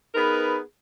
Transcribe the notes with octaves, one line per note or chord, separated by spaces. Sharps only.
B3 D#4 G#4 A#4 B4